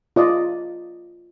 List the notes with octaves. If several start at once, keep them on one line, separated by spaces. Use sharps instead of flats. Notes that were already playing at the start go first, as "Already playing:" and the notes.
F4 D5 D#5